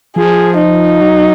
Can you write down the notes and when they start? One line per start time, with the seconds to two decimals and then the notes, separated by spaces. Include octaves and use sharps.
0.16 F3 G#4
0.58 D#4
1.01 F#3